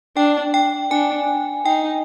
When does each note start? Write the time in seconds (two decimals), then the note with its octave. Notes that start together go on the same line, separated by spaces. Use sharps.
0.17 D4 G5
0.54 G5
0.91 D4 G#5
1.65 D#4 G5